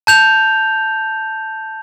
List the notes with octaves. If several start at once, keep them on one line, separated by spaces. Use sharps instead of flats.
A5 G6 F7